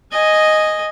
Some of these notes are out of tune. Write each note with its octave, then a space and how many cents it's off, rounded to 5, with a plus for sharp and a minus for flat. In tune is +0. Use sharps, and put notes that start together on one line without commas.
D#5 +0 G#5 +0